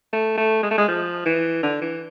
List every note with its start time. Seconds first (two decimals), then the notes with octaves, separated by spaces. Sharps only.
0.13 A3
0.38 A3
0.63 G#3
0.71 A3
0.78 G#3
0.88 F3
1.26 E3
1.63 D3
1.82 E3